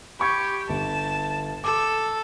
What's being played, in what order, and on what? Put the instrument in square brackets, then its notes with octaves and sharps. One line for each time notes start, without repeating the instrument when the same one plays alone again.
[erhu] G4 [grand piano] B5 C#6 G#6
[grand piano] G1 [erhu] A5
[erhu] A4 [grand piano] D6